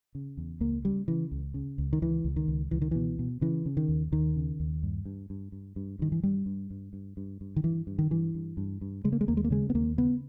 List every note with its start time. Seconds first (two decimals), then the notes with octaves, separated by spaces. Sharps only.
0.15 C#3
0.37 E2
0.60 C#2 A#3
0.84 C#3 G3
1.08 C#3 E3
1.31 C#2
1.54 C#3
1.78 C#2
1.93 D#3
2.02 C#2 E3
2.24 C#2
2.36 D#3
2.48 C#2
2.71 C#2 E3
2.82 D#3
2.91 B2 E3
3.19 B2
3.41 C#3 E3
3.66 C#3
3.77 D#3
3.88 D#2
4.12 D#2 D#3
4.36 C#3
4.60 D#2
4.83 G2
5.05 G2
5.30 G2
5.52 G2
5.76 G2
5.99 G2 D#3
6.12 E3
6.23 G2 G3
6.46 G2
6.71 G2
6.93 G2
7.17 G2
7.41 G2
7.56 D#3
7.64 G2 E3
7.87 G2
7.99 D#3
8.10 G2 E3
8.35 G2
8.57 G2
8.81 G2
9.04 C#3 G#3
9.12 A#3
9.21 G#3
9.28 D#2 A#3
9.37 G#3
9.44 A#3
9.50 C#3 G#3
9.70 B3
9.74 D#2 A#3
9.97 C#3 B3